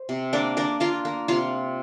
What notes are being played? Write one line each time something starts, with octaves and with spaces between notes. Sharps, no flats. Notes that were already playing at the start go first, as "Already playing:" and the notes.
Already playing: C5
C3
A#3 D4 D5
A#3 D4 D5
A#3 F4 F5
A#3
C3 F4 F5